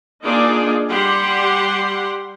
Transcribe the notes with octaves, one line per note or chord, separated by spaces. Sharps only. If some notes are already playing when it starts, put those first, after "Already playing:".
A#3 D4 D#4 F4 G#4 D5
G3 G4 F#5 C6